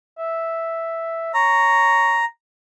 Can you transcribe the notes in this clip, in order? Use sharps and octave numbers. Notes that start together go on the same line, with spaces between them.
E5
C#5 A#5